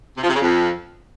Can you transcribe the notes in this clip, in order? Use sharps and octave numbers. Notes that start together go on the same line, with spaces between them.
C3
F3
C3
C#3
F2